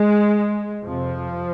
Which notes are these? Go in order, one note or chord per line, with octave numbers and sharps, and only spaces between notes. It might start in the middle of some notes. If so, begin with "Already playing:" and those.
Already playing: G#3
F2 C3 F3